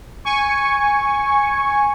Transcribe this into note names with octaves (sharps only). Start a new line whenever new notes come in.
G#5 C#6